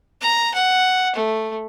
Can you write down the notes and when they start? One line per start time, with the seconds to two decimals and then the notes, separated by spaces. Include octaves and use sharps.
0.21 A#5
0.54 F#5
1.16 A3